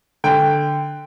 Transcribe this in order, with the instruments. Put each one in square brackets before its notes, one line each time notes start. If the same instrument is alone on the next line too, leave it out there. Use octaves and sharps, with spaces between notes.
[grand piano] D3 G5